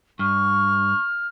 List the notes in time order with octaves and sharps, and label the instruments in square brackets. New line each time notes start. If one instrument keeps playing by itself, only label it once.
[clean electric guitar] G2 [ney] C#6 [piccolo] F6